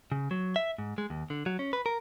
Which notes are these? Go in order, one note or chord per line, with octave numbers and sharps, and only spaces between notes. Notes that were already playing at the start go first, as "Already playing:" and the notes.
C#3
F#3
E5
G#2
G#3
D#2
D3
F#3
C#4
B4
A#4